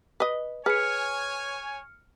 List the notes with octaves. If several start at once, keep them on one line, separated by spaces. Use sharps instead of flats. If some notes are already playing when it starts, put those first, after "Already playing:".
B4 D#5
G#4 B4 C#5 G#5 F6 C#7